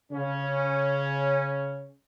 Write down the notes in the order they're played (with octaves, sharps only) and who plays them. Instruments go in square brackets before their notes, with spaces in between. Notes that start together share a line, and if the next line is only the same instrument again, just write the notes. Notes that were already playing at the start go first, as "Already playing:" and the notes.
[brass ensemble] C#3 C#4